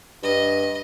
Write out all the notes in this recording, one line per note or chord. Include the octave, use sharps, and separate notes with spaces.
G2 D#5